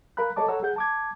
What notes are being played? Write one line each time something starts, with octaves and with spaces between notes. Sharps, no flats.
A#4 F5 A#5 B5 F#6
A4 C#5 D#5 A5 D6
A4 C#5 F#5 A#5 E6
G#4 F#5 G6
A5 D6 G#6